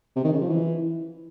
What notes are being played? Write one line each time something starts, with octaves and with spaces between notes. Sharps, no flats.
C3
D#3
C#3
F3
E3